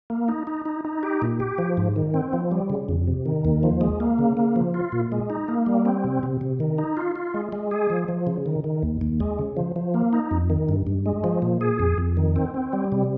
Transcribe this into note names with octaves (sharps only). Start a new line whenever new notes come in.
A#3
D#4
D#4
D#4
D#4
G4
A#2
G4
F3
G#2
D#3
C4
F3
G3
C#3
F2
C3
D#3
D#2
F3
G#3
A#3
C#3
A#3
F3
F4
A#2
G#3
D#4
A#3
G3
C4
C3
C3
C3
D#3
D#4
F4
F4
G#3
G#3
G#4
F3
F3
C#3
D#3
D#3
D#2
D#2
G#3
C#3
F3
F3
A#3
D#4
F2
D#3
G2
G2
G#3
F3
A#2
G#4
F2
F2
D#3
C4
C4
G3
C3